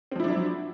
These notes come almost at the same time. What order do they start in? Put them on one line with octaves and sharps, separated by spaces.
C4 F3 E4 D4 F#3